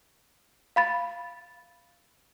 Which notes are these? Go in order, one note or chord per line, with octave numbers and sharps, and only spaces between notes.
F5 B5 A6